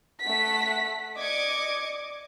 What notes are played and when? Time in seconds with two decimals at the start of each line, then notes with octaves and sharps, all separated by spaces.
0.21 A3 F#5 B6
1.17 D5 D#5 D6 G#6 C#7